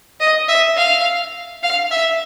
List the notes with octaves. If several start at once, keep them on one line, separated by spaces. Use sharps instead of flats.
D#5
E5
F5
F5
E5